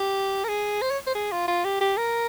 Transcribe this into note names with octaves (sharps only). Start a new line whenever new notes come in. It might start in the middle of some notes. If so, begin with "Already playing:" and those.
Already playing: G4
A#4
G#4
C5
C#5
C5
G#4
F4
F4
G4
G4
A#4